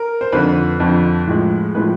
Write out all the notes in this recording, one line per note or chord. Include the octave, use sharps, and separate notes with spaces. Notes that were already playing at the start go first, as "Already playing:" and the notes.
Already playing: A#4
C5
F2 D3 F3 B4
F2 D3 F3
A2 F3 G#3
A2 F3 G#3 B4